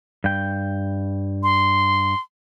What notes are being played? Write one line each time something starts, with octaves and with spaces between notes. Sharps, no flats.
G2 G5
C6